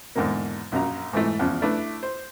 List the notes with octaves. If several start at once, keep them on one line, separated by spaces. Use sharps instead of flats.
E2 G#2 D3 D#3 A#3
A#1 F#2 F#3 A#5
G#2 E3 A3
E2 C#3 F3
A3 D4 E4 B4
C5